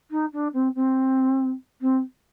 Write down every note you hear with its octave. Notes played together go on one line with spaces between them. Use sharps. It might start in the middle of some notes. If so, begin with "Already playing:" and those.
D#4
D4
C4
C4
C4